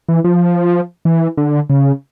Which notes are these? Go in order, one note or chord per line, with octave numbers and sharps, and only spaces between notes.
E3
F3
E3
D3
C#3